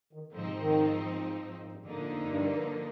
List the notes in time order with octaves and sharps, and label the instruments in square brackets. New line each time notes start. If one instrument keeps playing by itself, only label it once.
[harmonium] D#3
[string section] G#2 F3 C4 D#4 [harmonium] D3
[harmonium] C3
D#3
A#2
G2
[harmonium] G#2 [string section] D3 F3 A#3 D#4
[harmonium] A#2
F2
G2